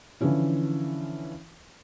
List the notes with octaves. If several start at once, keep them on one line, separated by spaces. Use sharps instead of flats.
D3 E3 F3 C#4 E4